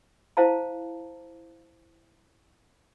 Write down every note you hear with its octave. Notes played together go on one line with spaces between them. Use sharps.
E4 C5 F5 A5 A#5